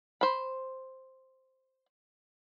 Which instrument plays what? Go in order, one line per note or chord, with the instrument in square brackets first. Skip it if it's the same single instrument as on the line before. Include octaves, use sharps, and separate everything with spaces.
[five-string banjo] C5 B5